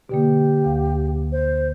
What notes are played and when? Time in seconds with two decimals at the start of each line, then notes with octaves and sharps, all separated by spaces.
0.09 B2 D3 A#3 G4
0.64 D2 F5
1.32 C5